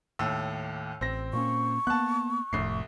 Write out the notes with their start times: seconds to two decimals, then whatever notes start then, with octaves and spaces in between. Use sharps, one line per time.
0.19 D#2 A2 E6
1.01 A1 C4 A#6
1.33 A#2 A#3 C#4 C#6
1.87 A#3 B3 A5 F#6
2.53 F1 C2 F2 A2 C7